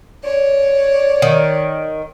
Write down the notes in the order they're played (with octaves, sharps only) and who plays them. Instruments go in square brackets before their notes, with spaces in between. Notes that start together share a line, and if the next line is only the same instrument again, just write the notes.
[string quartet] C#5 [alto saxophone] D5
[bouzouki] D#3